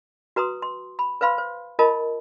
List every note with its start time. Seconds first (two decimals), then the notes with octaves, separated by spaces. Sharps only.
0.36 F#4 B4 A#5 C6 D#6
0.62 C6
0.99 B5
1.21 B4 C5 F5 B5 C6
1.38 C5
1.79 F4 A#4 D#5 A5 B5